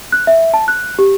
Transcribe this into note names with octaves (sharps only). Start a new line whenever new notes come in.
F#6
E5
A5
F#6
G4